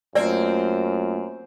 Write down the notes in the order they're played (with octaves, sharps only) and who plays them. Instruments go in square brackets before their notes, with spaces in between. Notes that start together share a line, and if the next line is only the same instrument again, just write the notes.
[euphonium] F#2 [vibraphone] A3 A#3 F4 [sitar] C4 [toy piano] D5